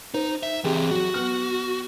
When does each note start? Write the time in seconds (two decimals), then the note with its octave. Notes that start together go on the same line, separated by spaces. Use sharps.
0.14 D#4 C5
0.43 E5
0.64 E3 C4 G4 G#4 G5
0.91 F#3 F#4
1.14 B3 F6